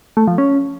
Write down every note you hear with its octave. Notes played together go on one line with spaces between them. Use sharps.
A3
F3
C#4